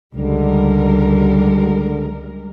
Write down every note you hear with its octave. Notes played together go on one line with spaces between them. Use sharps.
C#2 D3 G3 G#3 A#4